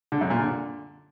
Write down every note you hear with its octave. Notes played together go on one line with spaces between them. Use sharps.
D3
F#2
A#2
D3